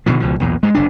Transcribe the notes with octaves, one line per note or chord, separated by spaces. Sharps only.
B2 D3 D#3 F3
C#2 B2 F3
B1 E2 A#2
G2 G#3
F#1 C3 D4